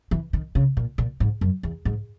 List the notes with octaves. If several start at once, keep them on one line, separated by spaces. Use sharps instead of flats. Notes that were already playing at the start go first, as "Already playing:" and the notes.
E3
D#3
C#3
A#2
A#2
G#2
F#2
E2
G#2